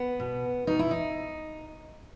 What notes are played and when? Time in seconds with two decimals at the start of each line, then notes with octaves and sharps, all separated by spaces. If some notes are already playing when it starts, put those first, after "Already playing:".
Already playing: B3
0.20 B2
0.67 B2 D#4
0.79 E4
0.91 D#4